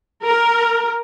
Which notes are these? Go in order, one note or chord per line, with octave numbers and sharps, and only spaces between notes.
A#4